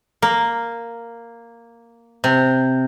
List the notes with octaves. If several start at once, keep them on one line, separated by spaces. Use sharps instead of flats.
A#3
C3